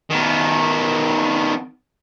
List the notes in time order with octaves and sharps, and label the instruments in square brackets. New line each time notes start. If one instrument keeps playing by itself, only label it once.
[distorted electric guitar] D#3 B3